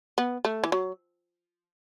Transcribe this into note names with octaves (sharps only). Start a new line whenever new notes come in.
B3
A3
E3
F#3